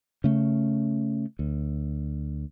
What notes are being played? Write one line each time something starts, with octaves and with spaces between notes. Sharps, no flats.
C#3 A3
D2